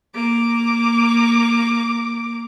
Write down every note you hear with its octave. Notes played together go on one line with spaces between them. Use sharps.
A#3 D6